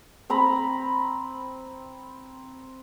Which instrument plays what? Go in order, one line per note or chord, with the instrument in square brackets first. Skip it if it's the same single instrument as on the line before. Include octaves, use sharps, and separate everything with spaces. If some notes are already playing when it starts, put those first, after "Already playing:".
[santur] C4 A#5 B5